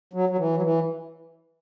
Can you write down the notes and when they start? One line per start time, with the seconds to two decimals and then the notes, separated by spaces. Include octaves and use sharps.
0.13 F#3
0.29 F#3
0.38 E3
0.56 F#3
0.62 E3